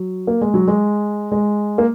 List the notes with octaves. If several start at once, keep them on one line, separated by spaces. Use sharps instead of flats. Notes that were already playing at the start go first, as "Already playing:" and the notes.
Already playing: F#3
A#3
G#3
F#3
G#3
G#3
A#3